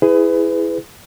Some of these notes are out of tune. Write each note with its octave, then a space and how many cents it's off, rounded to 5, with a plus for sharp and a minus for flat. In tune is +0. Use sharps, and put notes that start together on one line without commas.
E4 +0 G#4 +0 B4 +30